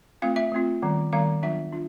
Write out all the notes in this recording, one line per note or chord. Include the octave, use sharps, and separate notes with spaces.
A3 C4 F4 F5
E5
A3 C4 F4
D#3 G3 B3
D#3 G3 B3 F5
F#3 B3 D4 F4 E5
D4 F4